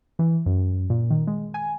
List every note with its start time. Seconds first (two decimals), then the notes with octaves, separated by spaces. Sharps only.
0.19 E3
0.46 F#2
0.90 A#2
1.10 D#3
1.27 G#3
1.54 G#5